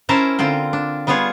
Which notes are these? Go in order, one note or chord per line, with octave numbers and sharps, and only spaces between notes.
C#4 E4 A#4 C5 A5 A#5
D3 C4 F4 G5
D4
G3 B3 F4 G#4 C#5